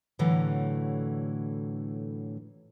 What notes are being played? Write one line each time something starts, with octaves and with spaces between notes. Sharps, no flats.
A2 D3 E3 F#3 A3